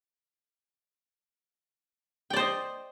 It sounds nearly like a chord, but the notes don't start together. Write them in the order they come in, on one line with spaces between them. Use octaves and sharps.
G5 D5 C5 D#5